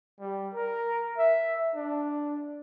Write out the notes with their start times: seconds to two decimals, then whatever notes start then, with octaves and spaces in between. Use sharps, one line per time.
0.20 G3
0.54 A#4
1.18 E5
1.75 D4